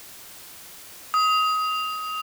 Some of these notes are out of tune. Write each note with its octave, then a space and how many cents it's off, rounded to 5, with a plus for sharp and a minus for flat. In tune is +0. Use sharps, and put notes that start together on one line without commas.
D#6 +25